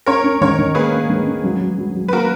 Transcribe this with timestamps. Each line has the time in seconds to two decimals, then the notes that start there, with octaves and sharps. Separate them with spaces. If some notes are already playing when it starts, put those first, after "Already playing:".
0.06 C#4 A#4 C#5
0.24 C#4
0.41 D#3 A#4 C#5
0.59 D#3
0.75 A#3 G#4 B4
0.93 A#3
1.10 D#3
1.27 C#4
1.44 F#3
1.61 F#3
1.78 F#3
1.95 F#3
2.08 B4
2.13 A#3 F#4 A#4